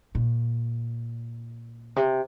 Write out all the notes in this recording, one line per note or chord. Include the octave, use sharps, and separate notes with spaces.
A#2
C3